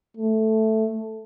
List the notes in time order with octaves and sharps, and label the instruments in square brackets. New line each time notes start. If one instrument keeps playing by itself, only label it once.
[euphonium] A3